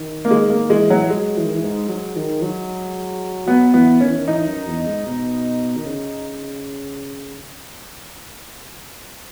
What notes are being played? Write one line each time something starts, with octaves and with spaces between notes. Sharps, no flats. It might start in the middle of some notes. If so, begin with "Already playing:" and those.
Already playing: D#3
A#3
D#3 G#3
A#3
E3 G#3
F#3
F#3 G#3
E3
D#3
E3
G#2
F#3
D#3
F#3
F#3 B3
E3 B3
D#3 C#4
E3
D#3
E3 D#4
F#2
E2
G#2
B2
D#3
C#3